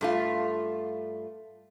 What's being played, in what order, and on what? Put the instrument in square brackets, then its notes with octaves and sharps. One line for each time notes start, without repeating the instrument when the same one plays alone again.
[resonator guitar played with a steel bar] G2 A3 F4